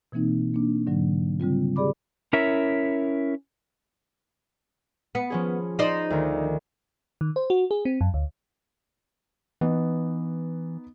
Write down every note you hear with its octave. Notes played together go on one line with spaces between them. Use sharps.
B2 E3 A#3 C4 D#4
A#3 D4
G#2 D3 F#3
C#3 G3 C4 F4
G4 G#4 D5 B5 D6
C#4 E4 A#4 C#5 E5
B3 C#7
F3 C#4 G#4
D#4 C5 D5
D2 D#3
D#3
C5
F#4
G#4
C4
F#2
D2
E3 B3 D#4